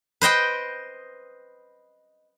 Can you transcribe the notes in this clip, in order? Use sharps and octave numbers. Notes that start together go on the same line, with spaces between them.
B4 C5 D#5 G5